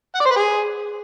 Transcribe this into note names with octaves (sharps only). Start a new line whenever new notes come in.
F#5
D5
C5
B4
G#4